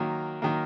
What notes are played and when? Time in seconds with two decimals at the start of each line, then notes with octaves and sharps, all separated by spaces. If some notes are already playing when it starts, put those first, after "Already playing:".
Already playing: D#3 F#3 A#3
0.42 D#3 F#3 A#3